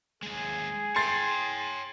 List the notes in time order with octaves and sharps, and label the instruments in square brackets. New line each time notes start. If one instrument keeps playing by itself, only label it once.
[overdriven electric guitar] D#2 G#3 [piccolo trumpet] G#4
[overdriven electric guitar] C#5 G5 [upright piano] C6 A6 C7